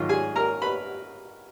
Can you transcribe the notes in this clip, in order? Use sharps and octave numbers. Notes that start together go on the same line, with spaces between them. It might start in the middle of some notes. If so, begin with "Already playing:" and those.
Already playing: G#2 D#3 F#3 F4
G#4 G#5
A#4 A#5
B4 B5